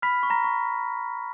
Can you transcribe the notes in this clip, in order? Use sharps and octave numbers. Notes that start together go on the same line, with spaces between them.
B5 F6 B6
C#6
A#5 A#6
C#6